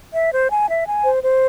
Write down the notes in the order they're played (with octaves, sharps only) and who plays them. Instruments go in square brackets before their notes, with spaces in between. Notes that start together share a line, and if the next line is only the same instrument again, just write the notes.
[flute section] E5
C5
G#5
E5
G#5
C5
C5